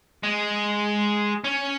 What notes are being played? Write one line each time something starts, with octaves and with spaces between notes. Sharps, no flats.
G#3
C#4